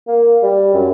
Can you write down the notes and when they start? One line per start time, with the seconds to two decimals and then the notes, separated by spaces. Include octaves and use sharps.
0.08 A#3
0.43 G3
0.74 F#2